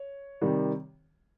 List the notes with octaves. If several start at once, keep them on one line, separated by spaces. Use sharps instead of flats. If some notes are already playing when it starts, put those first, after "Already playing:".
Already playing: C#5
C3 D#3 G3